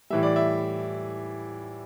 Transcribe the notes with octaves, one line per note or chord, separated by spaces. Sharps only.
A2 E3 G3 E5
D5
E5